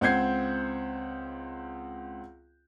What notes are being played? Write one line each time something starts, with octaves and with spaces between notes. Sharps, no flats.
C#2 C4 F#5 G6 G#6 C7